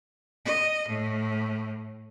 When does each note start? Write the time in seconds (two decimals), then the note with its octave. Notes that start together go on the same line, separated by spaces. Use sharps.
0.45 D#5
0.88 A2